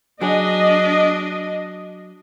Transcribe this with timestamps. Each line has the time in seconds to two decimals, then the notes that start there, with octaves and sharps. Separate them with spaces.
0.21 F#3 D4 G#4 D#5